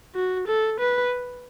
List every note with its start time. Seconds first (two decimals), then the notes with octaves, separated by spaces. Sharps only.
0.15 F#4
0.47 A4
0.79 B4